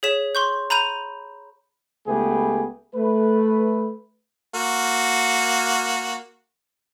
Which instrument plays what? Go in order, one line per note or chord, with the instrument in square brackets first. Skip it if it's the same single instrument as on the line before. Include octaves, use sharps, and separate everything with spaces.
[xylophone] G#4 C#5 B6 E7
C6 C#6 G6
A#5 B5 G6 D#7 F7
[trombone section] C#2 A3 B3 G4 G#4 B4
A3 B4
[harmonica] A#3 F#4